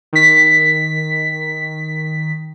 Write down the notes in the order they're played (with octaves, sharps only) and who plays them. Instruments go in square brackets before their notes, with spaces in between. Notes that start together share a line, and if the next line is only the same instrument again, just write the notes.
[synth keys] D#3 B6